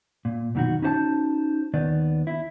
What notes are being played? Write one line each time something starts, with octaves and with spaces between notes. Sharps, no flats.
A#2
F#2 B2 D#3 E3 F#4
C#4 D#4 F#4 C5 F5 A5
D#2 D#3 B3 D5
E4